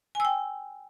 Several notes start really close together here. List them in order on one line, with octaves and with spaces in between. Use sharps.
G#5 E6 G5